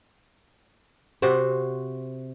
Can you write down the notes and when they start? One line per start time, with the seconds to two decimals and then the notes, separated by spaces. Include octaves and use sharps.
1.22 C3 F#4 C5